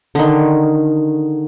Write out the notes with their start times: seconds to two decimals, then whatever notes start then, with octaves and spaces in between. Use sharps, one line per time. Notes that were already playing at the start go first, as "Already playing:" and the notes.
0.15 D3 D#3